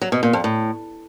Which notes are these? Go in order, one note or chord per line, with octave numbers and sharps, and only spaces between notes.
F#3
B2
A#2
F2
A2